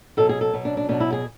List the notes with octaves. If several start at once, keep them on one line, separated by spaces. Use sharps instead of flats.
B2 F#3 A4
G#4
A4
B2 F#3
D4
D4
B2 F#3 D4
E4
G#4